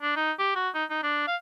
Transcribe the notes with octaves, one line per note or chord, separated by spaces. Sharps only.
D4
D#4
G4
F#4
D#4
D#4
D4
F5